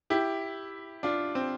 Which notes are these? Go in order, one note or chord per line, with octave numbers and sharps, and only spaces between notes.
E4 G4
D4 F4
C4